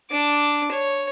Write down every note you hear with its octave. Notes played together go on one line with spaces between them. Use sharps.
D4 D6
C#5